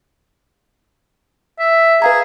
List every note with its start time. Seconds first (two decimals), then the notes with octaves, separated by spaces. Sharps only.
1.59 E5
2.02 G#4 B4 F5 A#5